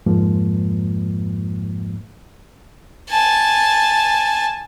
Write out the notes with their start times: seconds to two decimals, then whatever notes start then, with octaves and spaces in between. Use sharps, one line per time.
0.06 F2 G#2 F3 G#3 A#3
3.10 G#5 A5